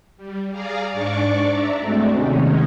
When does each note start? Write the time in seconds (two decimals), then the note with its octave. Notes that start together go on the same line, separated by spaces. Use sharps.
0.17 G3
0.51 G#4 D5 F5 A#5
0.91 G#2 D4 D5 C#6 D6
1.49 D5 E5 A#5
1.78 G#3 A3 C4 D4 F#4
2.10 D#2 C3 D#3 G#3 C#4 D#4